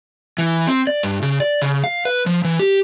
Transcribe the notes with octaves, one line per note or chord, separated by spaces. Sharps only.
E3
C4
D5
G2
C#3
D5
C#3
F5
B4
F3
E3
G4